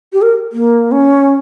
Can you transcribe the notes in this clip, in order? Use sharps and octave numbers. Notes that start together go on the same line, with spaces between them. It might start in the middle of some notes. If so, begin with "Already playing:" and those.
G4
A#4
A#3
C#4